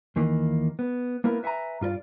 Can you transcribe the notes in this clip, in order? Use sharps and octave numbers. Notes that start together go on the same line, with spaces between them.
D#2 D#3 E3 A#3
B3
A#3 B3 E4 A#4
B4 E5 F#5 G#5 A#5
G2 F4 A#4 D5